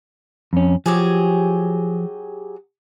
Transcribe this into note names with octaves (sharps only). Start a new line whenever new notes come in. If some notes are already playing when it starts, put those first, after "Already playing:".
F2 C#4
F3 F#3 G4 G#4